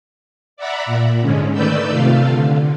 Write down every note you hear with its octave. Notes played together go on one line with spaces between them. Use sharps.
D5 E5 F#5 A#5 B5
A#2
G#2 D3 G#3 C#4
D#3 A3 B4 D5 E6 G6
C3 A3 F4 F5
D3